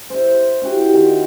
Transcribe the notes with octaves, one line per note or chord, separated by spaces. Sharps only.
C5 E5
E4 F#4 G4
D#3